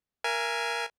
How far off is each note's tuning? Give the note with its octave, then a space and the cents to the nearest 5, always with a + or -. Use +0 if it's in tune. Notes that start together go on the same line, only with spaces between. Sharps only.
A#4 +10 E5 +40 G#5 +0